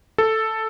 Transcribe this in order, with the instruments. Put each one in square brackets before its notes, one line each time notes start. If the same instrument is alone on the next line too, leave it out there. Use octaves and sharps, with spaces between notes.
[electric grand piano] A4